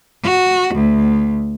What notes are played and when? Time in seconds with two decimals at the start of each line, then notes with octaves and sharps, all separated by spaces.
0.24 F#4
0.75 D2